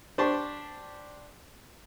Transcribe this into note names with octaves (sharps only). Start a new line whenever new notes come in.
D4 G4 C5 A5 C#6